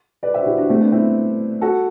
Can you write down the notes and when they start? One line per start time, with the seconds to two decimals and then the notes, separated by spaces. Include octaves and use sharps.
0.23 B4 D5
0.34 C5 E5
0.41 F#4
0.46 E4 G4
0.58 D4 F#4
0.69 A3 C4
0.81 B3 D4
0.92 C4 E4
1.62 F#4 A4